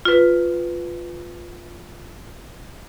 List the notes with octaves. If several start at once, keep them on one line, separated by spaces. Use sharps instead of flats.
F4 B4